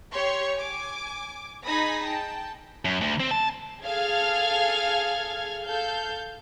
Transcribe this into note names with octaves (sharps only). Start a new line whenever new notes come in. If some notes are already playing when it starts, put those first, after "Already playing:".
G4 C#5 C6 C#6
G#5 D6
D#4 G#4 G#5 B5 D#6 A#6
G5 A5
F#2
D2
C4
A5
G#4 A4 F5 F6 G#6
A4 F5 G6